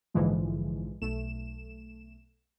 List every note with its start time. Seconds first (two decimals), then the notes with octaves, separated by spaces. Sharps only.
0.14 A#1 G#2 D3 E3 F3 G#3
1.01 B1 A3 E7